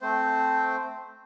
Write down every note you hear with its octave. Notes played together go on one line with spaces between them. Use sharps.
A3 C4 C5